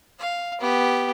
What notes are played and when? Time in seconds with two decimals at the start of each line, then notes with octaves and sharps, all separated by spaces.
0.19 F5
0.60 B3 G4